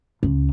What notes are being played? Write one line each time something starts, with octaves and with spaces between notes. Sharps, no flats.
C#2